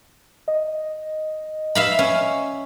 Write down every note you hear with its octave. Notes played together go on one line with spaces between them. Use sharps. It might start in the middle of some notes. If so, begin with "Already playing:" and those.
D#5
E5 F5 B5
C#4